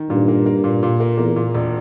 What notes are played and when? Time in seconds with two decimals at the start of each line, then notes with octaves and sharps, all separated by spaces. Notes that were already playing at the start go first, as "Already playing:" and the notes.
Already playing: D#3
0.10 G2 A#2
0.28 A#3
0.46 A#3
0.64 A#2
0.83 A#2
1.00 A#3
1.18 E2 A#3
1.36 A#2
1.54 E1